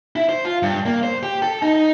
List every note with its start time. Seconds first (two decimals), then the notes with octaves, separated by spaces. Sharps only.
0.16 E4
0.29 C5
0.45 F4
0.63 G2
0.86 A#3
1.03 C5
1.23 G4
1.42 A4
1.62 D#4